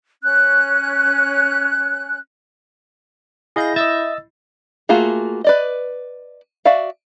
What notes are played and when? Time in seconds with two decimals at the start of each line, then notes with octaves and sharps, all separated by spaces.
0.23 C#4 F#6
3.56 E4 G#4 D#5 F5 G6 A#6
3.76 D#5 E5 E6 A6
4.89 A3 A#3 F4 F#4 G#4
5.44 B4 D5 D#5
6.65 F#4 D5 E5 F5